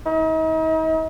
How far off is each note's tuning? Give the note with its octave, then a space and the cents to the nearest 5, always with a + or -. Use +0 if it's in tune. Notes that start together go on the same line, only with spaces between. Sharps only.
D#4 +40